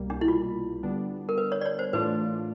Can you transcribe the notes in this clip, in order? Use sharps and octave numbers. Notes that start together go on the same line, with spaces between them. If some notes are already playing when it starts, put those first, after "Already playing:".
Already playing: C2 B2 G3 A#3
D4
E4
F4
D3 G3 B3 D4
A#4
B4
C#5
D5
C#5
C5
A2 E3 A3 D4 F4 B4